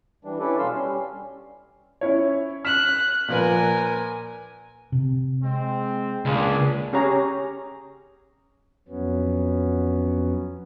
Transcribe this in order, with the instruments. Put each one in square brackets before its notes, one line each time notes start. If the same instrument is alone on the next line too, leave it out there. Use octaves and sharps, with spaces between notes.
[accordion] E3 G3 D4
C#4 D4 E4 A4 B4 D5
B2 G3 F5 C6 E6 F6
G3 C#4
[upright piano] C#4 E4 C#5
[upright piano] F6 B6 E7 [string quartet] F#6
[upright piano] A#2 F3 B4 [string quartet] A#4 G#5
[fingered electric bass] C3
[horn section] G#3 C4
[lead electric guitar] C#2 [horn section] A#3 D4 G#4
[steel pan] C#4 G4 G#4 C#5 A#5
[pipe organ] F2 F#3 B3 C#4